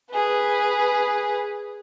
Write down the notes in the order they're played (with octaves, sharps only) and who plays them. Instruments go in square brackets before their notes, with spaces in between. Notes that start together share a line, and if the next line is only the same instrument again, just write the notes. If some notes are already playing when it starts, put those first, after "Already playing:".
[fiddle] G#4 B4